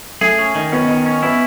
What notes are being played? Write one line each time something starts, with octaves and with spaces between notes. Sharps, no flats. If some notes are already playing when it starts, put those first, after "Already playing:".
A3 G#4
C#4
D#3
B3 C#4
D#3
C#4
B3 E4